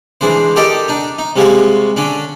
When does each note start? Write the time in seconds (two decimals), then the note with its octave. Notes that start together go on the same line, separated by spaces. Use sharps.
0.21 E3 G#3 D4 C5
0.56 G4 A4 A#4 D5 D#5 G5
0.88 D4 D#4
1.19 D#4
1.36 C3 G3 G#3 F4 F#4
1.96 D3 C#4 D4